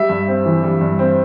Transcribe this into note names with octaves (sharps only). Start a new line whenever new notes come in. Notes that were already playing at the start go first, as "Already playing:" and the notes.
Already playing: G3 E5
G2
C4
E3
G3
G2
C4